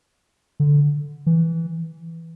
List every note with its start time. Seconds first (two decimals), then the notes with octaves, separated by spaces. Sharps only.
0.60 D3
1.26 E3